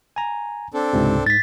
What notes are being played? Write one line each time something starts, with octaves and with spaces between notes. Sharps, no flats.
G#5 A#5
C4 D4 A4
C#2 G#2 C3
G#2 A6 B6